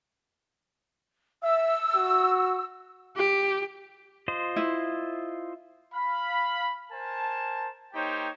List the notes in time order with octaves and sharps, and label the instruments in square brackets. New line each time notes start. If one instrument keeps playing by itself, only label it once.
[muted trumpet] E5 [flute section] E6
[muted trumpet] F#4
[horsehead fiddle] G4
[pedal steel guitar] F4 C5 D#5
[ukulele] E4
[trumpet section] F5 B5
A#4 C5 G#5 A5
A#3 D#4 G4 C5 C#5 G5